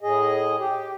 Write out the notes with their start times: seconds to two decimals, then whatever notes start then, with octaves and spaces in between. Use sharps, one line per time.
0.01 A2 G#4 D#5
0.59 G4